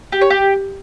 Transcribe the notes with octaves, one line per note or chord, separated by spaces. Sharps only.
G4
C#5
G4